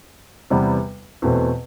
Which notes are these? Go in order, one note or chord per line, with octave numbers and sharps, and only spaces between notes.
E2 C3 G3 B3
E2 B2 A3 C4